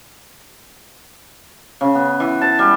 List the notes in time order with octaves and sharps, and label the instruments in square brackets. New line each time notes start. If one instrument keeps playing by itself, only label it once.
[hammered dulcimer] C#3
B3
E3
A5
G3